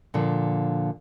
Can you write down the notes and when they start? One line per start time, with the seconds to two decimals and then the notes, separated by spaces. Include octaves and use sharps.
0.14 A#2 D3 F3